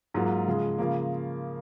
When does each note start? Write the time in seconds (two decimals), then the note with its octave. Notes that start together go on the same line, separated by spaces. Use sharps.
0.14 G#2 F#3 A#3 F4
0.47 C#3 F3 G#3
0.78 C#3 F3 A#3